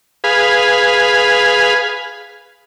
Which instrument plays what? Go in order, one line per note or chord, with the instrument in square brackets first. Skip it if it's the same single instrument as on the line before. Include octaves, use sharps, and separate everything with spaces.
[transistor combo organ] G#4 B4 F5